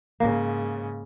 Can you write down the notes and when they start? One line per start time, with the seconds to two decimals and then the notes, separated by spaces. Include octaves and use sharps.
0.20 G#2 C#3 A#3